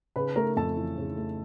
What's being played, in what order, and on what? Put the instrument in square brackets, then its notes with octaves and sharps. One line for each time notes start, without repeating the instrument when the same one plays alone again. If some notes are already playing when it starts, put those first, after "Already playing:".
[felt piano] C#3 [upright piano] B4 B5
[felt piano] A3 [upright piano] A#4 A#5
[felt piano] F2 [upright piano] A4 A5
[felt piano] E3
C#3
A3